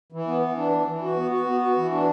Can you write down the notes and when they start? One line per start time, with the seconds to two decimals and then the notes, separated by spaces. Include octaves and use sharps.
0.12 E3
0.27 B3
0.42 E3
0.57 D4
0.72 E3
0.87 E3
1.02 F#4
1.16 B3
1.31 F#4
1.46 B3
1.61 F#4
1.76 E3
1.91 D4